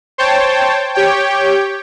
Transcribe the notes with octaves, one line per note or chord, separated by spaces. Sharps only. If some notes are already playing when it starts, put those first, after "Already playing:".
C5 C#5 G5 A5
G4 C#5 G5